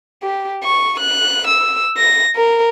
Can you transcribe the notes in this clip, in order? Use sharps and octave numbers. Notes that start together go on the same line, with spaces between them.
G4
C#6
F#6
E6
A#6
A#4